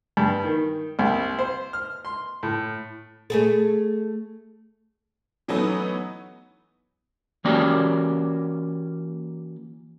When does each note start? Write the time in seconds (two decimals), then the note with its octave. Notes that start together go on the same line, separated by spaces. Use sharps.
0.17 G2
0.44 D#3
0.99 C2
1.39 C5
1.73 F6
2.05 C6
2.43 A2
3.30 A3 G#4 A4
5.48 E3 F#3 A3 B3 C#4 D#4
7.45 E3 A#3 C#4 F#4 G4 D5